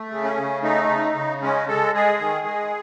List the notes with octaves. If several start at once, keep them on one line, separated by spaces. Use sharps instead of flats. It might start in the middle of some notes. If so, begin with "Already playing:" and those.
Already playing: A3
C#3
C#4
C#3
A3 D#4
C#3
C#3
G#3 C#4
G#3 A4
G#3 G#4
D#3
G#3